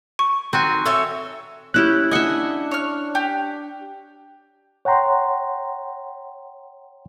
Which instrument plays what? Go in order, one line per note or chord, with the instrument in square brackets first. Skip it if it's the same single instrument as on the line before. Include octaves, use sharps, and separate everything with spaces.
[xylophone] C#6
[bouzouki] D#3 [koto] C4 F#4 G#5
[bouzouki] A4 C#5 E5
[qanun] C#4 E4 G4 [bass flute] C#5 [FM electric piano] F#6
[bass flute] D4 [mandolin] D#5 F#5 [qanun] E5 G#5
[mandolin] C#5 F6
G4
[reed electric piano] C#5 F#5 G5 A#5 C6